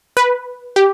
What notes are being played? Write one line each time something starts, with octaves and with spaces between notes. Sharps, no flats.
B4
G4